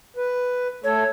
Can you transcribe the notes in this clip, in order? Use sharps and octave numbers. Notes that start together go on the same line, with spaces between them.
B4
A3 A4 C#5